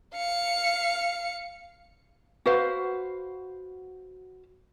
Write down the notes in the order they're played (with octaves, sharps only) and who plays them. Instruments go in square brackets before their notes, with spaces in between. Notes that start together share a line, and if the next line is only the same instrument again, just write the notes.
[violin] F5 C#7
[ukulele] F#4 B4 C5 F5